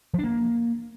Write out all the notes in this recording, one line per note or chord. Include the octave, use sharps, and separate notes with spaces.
F3
D4
A#3